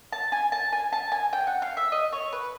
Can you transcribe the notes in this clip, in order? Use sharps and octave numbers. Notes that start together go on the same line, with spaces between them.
A5
G#5
A5
G#5
A5
G#5
G5
F#5
F5
E5
D#5
C#5
B4